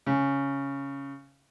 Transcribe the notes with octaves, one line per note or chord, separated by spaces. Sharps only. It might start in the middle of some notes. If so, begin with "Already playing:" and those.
C#3